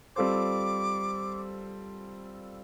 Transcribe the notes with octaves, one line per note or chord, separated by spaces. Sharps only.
G3 C4 F4 A4 C5 D6